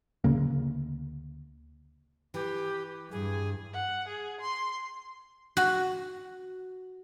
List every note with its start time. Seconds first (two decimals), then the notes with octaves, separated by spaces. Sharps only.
0.24 D2 C#3 A#3
2.34 E3 G4
3.11 G2 G#4
3.73 F#5
4.08 G#4
4.41 C6
5.57 F#4